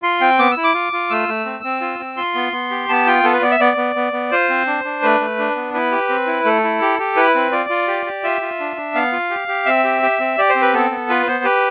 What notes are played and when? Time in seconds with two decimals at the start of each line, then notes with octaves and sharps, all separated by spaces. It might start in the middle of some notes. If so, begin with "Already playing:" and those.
0.03 F4 C6
0.21 C4 G5
0.39 B3 D6
0.51 E6
0.57 E4
0.64 D6
0.74 F4
0.93 F4
1.10 A3 E6
1.28 A3
1.45 C4
1.64 C4
1.81 F4
2.00 C4
2.17 F4 C6
2.35 B3
2.52 B3
2.71 G4
2.89 B3 A5
3.07 F4 G5
3.24 B3 A4
3.33 B4
3.42 B3 D5
3.51 E5
3.60 B3 D5
3.77 B3
3.96 B3
4.13 B3
4.31 F4 C5
4.49 C4
4.67 D4
4.84 D4
5.03 A3 B4
5.20 A3
5.39 D4
5.56 B3
5.74 E4 B4
5.92 G4
6.09 C4
6.27 E4
6.45 A3 A4
6.64 E4
6.82 G4
6.99 G4
7.16 E4 B4
7.35 C4
7.52 F4 D5
7.70 F4
7.87 G4
8.06 G4
8.24 F4 E5
8.41 F4
8.60 D4
8.77 D4
8.94 B3 F5
9.12 F4
9.30 G4
9.48 G4
9.66 C4 E5
9.84 G4
10.03 G4
10.20 C4
10.38 G4 D5
10.49 C5
10.55 C4
10.62 B4
10.73 B3 A4
10.91 B3
11.09 F4 B4
11.27 B3 C5
11.44 G4 B4